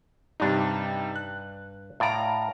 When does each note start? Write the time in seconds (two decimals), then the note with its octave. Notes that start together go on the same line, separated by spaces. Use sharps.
0.40 G2 C3 G3 D4 D#4
1.16 F#6
2.00 A2 D5 F5 A#5